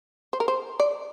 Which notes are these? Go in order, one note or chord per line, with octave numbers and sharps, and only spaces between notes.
C5
A#4
C5
D5